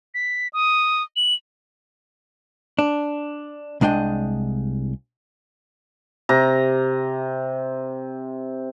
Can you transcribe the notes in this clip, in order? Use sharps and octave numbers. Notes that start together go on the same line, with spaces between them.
B6
D#6
F#7
D4
C2 G#3 D4 D#5 G5
C3 A#5